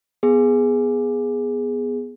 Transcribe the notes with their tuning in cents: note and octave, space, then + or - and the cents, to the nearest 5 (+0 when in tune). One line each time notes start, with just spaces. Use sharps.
B3 +0 G#4 +0